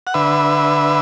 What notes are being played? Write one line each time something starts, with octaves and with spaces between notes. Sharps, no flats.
F#5
D3 B4 E5